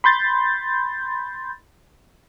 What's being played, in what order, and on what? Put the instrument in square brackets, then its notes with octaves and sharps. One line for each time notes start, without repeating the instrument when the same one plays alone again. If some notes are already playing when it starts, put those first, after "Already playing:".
[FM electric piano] B5 C6 G6 A6